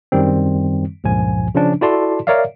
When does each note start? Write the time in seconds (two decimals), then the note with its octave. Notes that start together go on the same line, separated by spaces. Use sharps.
0.12 F#2 D#3 G3 C4
1.04 C#2 G2 A#2 F3 G#5
1.55 C#3 F3 C#4 D4
1.81 E4 F#4 A4 D5 A5 C6
2.27 A#4 C#5 D5 E5 F5